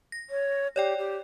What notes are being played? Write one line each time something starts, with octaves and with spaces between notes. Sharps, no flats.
A#6
C#5
G4 C#5 D5 G5
G4